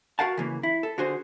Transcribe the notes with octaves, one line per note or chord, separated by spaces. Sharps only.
F#4 A#4 F5 F#5 A5
C#3 E3 A#3
E4
A4
D3 F#4 G#4 C5